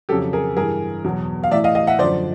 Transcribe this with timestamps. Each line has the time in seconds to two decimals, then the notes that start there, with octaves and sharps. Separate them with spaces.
0.09 F2 C#3 F#3 G4 A4
0.33 G#4 A#4
0.57 G2 E3 G#4 A#4
1.04 E2 B2 F#3
1.44 F5
1.51 A2 E3 D5 E5
1.64 D#5 F5
1.75 D#5 F5
1.87 E5 F#5
1.99 F#2 D3 F3 C5 D5